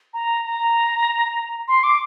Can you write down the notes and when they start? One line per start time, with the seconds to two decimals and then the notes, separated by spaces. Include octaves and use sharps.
0.14 A#5
0.45 A#5
1.68 C6
1.83 D6